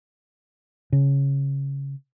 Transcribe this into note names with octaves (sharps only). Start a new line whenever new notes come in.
C#3